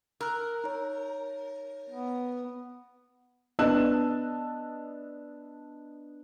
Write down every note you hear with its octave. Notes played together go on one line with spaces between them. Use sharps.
A#4 E6 F#6
D#4 C#5
B3
B3 D4 D#5 A5 E6 F#6